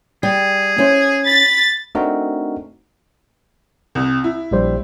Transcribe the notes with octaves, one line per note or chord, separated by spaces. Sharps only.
G3 G#4
C#4 E4 C5
B5 A6
A3 C4 D4 D#4 F#4 A#4
C2
E4
A#1 G3 C5